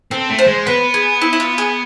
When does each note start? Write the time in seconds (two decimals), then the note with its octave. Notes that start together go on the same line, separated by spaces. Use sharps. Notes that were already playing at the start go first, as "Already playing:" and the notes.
0.11 C4 A4
0.30 A3
0.39 C5
0.47 G#3
0.66 B3 B4
0.94 G#4
1.21 E4
1.33 E4
1.40 F4
1.58 G#4